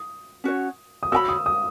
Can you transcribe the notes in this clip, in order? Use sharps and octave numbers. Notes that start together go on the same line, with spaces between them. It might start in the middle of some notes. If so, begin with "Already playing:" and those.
Already playing: D#6
C#4 F#4 C#5
D#6
F#4 C#5 G#5 B5 E6
D#6
D#6